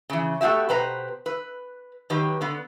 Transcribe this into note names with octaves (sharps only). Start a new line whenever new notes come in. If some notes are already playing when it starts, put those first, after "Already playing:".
C#3 E3
A3 B3 F#4 G4 E5
B2 G4 B4 C5 A#5
B4
D#3 F#3 G4 B4
D3 B3